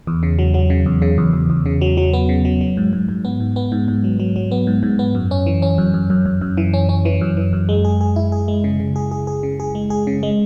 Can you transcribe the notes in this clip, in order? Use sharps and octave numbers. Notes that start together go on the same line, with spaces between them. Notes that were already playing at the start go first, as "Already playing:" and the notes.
E2
C#3
F#3
F#3
C#3
E2
C#3
E2
E2
E2
C#3
F#3
F#3
B3
C#3
F#3
F#3
G#2
G#2
G#2
B3
G#2
B3
G#2
G#2
F#3
F#3
F#3
B3
G#2
G#2
B3
F#2
C#4
E3
C#4
F#2
F#2
F#2
F#2
F#2
E3
C#4
C#4
E3
F#2
E3
F#2
G#3
G#4
G#4
E4
G#4
G#3
C#3
C#3
G#4
G#4
G#4
C#3
G#4
G#3
G#4
C#3
G#3